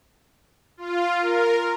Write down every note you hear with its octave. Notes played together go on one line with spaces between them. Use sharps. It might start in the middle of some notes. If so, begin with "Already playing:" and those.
F4
A#4